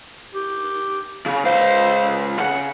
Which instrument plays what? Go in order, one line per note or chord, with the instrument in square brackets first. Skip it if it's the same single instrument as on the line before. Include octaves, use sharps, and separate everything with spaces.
[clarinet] G4
[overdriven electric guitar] C#3
[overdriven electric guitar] C#2 F5 [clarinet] C5
[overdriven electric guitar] C#3 [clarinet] F#5